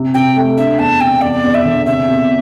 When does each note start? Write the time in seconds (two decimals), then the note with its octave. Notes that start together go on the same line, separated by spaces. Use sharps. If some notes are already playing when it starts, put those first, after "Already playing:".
Already playing: C3
0.14 C3 G5
0.36 A3
0.57 D4 E5
0.79 E2 A5
1.01 C3 G5
1.21 E2 D5
1.44 E2
1.54 E5
1.65 D3
1.86 C3 E5
2.08 C3